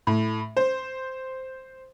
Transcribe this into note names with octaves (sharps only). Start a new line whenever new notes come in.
A2
C5